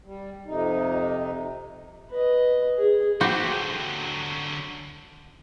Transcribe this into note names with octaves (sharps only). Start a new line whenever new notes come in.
G3
F2 C3 D#4
B4 D#5
G#4
D3 F#3 F#4 G4 C5